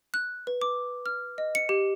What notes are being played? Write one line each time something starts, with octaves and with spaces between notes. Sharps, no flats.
F#6
B4
D6
F6
D#5
C#7
G4